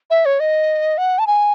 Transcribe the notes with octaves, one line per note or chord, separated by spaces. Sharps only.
E5
C#5
D#5
F#5
A5
G#5